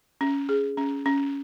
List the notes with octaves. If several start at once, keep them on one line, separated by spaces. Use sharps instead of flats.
C#4
G#4
C#4
C#4